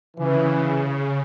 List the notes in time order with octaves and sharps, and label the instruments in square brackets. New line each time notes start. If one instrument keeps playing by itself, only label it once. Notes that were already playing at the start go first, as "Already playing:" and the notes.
[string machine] C#3 [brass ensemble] E3